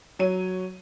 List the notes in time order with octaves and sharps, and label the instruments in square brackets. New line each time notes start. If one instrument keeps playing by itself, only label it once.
[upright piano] F#3 C#5 D#7